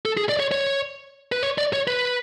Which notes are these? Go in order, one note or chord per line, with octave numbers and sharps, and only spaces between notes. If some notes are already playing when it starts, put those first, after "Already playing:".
A4
G#4
D5
C#5
C#5
B4
C#5
D5
C#5
B4